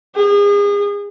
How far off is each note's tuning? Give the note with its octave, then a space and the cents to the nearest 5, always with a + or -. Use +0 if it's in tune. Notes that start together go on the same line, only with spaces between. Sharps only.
G#4 -35